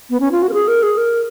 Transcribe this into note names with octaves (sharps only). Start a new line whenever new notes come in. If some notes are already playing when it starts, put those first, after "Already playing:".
B3
C#4
F4
F#4
A#4
G#4
A#4
G#4
A#4